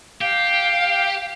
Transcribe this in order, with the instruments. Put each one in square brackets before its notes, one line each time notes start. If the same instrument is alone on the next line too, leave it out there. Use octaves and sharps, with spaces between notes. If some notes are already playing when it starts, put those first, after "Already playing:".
[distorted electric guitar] G4 [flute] F5